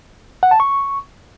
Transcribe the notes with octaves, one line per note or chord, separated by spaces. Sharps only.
F#5
A5
C#6